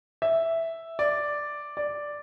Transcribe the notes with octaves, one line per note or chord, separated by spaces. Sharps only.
E5
D5
D5